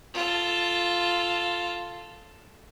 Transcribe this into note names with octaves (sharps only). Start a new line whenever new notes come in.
F4 A4